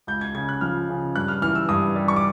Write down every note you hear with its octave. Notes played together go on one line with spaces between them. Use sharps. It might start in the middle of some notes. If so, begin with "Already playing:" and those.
C#2 G6
G#6
C#3 G#6
F#6
F3 F6
C#3
G2 F#6
F6
E3 F6
E6
G2 D#6
G3
C#6
D6